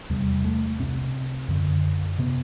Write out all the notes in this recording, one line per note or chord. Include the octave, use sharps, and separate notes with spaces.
E2 C3 G3
A3
C2 C3 C4
F#2 D3
C3 B3